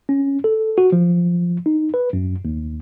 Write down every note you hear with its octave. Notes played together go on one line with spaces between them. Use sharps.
C#4
A4
F#4
F3
D#4
B4
F#2
D#2